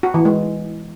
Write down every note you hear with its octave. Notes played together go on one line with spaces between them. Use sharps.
F#4
E3
G#3